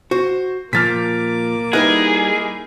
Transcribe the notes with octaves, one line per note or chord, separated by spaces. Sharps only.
F#4 C5
A#2 F3 A#3 D6 F6 A6 B6
G3 D#4 E4 G#4 A#4 B4 F#5